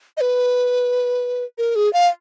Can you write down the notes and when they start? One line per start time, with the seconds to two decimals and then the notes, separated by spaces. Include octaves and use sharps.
0.17 D#5
0.21 B4
1.58 A#4
1.76 G#4
1.93 F5